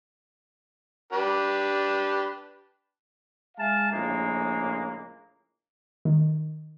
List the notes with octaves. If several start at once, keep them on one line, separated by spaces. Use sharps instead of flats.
D4 G4 B4
G#3 E5 F5 G#5 A5
A#1 A2 C#3 G#3 A#3
D#3